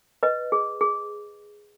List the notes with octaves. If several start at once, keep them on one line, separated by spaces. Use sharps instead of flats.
B4 D#5
G#4
G#4